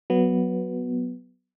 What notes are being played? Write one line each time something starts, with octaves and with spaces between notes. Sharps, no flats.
F#3 B3